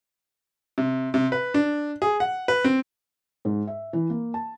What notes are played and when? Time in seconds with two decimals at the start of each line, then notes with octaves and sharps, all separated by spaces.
0.78 C3
1.14 C3
1.32 B4
1.54 D4
2.02 G#4
2.20 F#5
2.48 B4
2.64 C4
3.45 G#2
3.67 E5
3.93 E3
4.10 A#3
4.34 A5